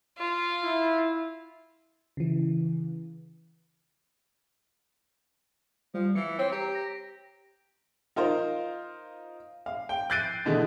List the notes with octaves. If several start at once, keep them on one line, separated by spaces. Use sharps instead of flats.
F4
E4
C#3 E3
F3 G3
E3 C#7
C4 C#5
G4 A#5
A#6
D#4 F4 A#4 C5
F5
G5
F#6 G6 A6 C7 D7 D#7
B2 D3 E3 G#3 A3